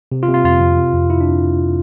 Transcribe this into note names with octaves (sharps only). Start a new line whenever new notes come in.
C3
F4
C3
F4
F2 F4
F2
C3
F2
F2 E4
D4